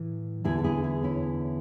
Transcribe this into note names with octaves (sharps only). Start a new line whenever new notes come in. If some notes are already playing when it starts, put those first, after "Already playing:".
Already playing: A2 E3
E2 D3 E4 G#4
A4
E4 G#4
E4 G#4
C#4 E4